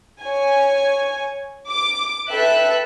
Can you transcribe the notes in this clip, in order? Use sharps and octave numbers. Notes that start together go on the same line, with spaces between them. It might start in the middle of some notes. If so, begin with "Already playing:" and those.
C#5 G#5
D6
A4 B4 E5 G5 F#6